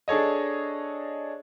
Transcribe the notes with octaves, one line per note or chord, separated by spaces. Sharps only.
D4 G#4 A4 C#5 D#5